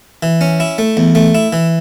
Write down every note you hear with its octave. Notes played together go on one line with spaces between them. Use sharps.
E3
C#4
E4
A3
E2
A3
E4
E3